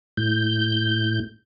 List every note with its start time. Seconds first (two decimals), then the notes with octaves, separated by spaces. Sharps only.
0.17 A2 G6